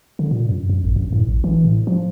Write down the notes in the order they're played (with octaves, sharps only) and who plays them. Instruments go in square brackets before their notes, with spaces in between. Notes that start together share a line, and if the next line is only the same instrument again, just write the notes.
[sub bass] D3
A#2
F#2
F#2
A1
F#2
A2
A1
E3
A2
F3